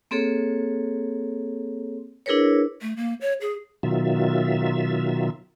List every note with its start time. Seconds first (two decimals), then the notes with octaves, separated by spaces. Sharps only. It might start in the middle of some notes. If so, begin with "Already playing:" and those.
0.11 A#3 C4 G#4 A4 C#5
2.26 D4 E4 G#4 A#4 B4 C#5
2.82 A3
2.97 A#3
3.21 C#5
3.41 G#4
3.83 B2 D#3 F#3 F4 E5